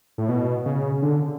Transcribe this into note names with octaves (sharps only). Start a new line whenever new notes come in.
A2
B2
C#3
D3